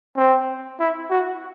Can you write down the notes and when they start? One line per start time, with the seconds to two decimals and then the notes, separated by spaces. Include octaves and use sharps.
0.17 C4
0.80 E4
1.10 F#4